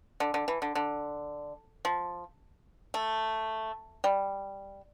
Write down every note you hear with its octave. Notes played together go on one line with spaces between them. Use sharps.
D3
D3
E3
D3
D3
F3
A3
G3